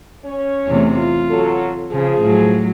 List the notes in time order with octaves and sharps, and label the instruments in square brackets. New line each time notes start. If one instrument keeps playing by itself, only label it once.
[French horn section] C#4 C#5
[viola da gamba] E2 C3 A3
F4
[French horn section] F#3 A4
[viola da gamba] C#3 [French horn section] F3 G#4
[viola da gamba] A2 F#3